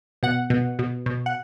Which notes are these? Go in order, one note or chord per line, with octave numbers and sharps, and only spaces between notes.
B2 F#5
B2
B2
B2
F#5